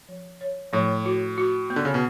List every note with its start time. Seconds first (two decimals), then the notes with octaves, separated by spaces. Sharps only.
0.09 F3
0.41 C#5
0.73 A2 F3
1.05 F#4
1.38 F#4
1.70 B3
1.76 D3
1.85 C#3
1.94 B2